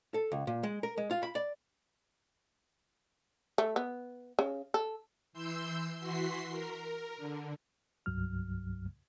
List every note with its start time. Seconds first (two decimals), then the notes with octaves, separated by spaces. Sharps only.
0.14 A4
0.32 C#2
0.47 A#2
0.63 G#3
0.83 A#4
0.97 G#3
1.11 F4
1.23 B5
1.35 D5
3.58 A3
3.76 B3
4.39 C#3
4.74 A4
5.33 E3 C6 E6 G6
6.00 E3 F#4 C6 B6 C7
6.50 A#4
7.17 D3
8.06 C2 G2 F#3 F6